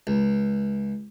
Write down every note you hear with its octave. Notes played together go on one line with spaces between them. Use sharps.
C#2